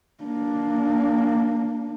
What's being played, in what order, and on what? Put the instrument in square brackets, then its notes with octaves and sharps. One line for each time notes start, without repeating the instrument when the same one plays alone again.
[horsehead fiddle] A#3 D4